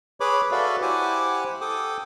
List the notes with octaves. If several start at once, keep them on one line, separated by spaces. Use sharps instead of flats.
G#4 B4 C#5 B5 D6
F#4 A4 B4 D5 E5 F5
E4 G4 C5 F#5 G#5 D6
A4 G5 D6 D#6